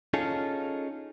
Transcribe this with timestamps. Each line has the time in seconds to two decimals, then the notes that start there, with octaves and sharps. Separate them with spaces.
0.14 C#4 D#4 F4 G#4 A4